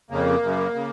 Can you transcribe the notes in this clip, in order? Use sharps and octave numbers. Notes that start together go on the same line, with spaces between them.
F2 C#3 A#3
F#2 C#3
C#3